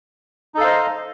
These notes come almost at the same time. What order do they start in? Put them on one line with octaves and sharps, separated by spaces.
D#4 A4 F5 C5 D#5